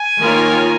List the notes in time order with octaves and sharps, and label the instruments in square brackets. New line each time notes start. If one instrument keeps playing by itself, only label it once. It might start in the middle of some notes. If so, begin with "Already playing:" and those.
Already playing: [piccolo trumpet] G#5
[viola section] D#3 A#3 F4 A#4 C#5